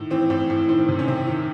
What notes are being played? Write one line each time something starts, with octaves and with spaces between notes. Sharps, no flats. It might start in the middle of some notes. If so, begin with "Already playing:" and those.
Already playing: A2 D#3
E3 C4
A2 C4
A2
D#3 C4
C3
C#4
C3 C4
D#3